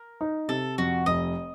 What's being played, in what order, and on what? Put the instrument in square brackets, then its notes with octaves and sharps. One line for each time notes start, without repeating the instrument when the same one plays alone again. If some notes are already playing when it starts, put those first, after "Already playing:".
Already playing: [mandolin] A#4
[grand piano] D#4
[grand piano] C3 [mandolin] A4
[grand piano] F2 [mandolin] F#4
[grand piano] F1 [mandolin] D#5